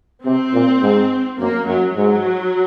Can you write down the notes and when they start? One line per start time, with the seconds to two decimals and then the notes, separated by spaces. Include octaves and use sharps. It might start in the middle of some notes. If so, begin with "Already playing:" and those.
0.25 C3 C4
0.53 A#2
0.82 G#2
1.39 F#2 A#3
1.67 F#2 F#3
1.95 G#2 F#3